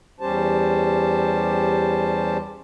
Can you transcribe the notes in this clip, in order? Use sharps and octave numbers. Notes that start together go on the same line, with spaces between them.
E2 G3 C#4 G4 C5 A5